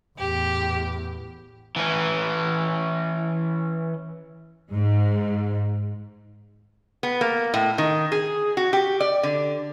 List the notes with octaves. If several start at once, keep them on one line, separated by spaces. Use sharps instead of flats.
E2 A2 G4
E3 C#4
G#2
B3
A#3
A2
D#3
G#4
F#4
G4
D5
D3